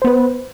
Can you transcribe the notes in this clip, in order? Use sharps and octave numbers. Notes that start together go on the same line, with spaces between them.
B3 B4 C5